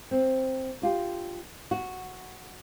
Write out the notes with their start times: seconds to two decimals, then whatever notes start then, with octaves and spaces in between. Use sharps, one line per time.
0.11 C4
0.82 D4 F4 G4
1.71 F#4